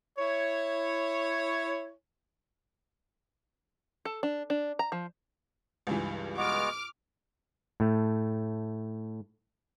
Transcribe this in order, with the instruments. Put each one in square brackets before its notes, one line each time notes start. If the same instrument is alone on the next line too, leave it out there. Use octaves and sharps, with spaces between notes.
[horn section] E4 C#5
[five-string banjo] A4
D4
D4
A#5
F3
[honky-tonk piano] C#2 G2 E3
[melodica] G#3 B3 F#4 [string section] D6 F6
[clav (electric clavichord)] A2 A3